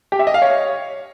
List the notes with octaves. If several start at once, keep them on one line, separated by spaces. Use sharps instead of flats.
G4
E5
D#5
F5
C#5